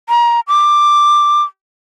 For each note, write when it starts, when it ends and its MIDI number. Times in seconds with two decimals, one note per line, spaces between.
0.09 0.40 82
0.48 1.42 86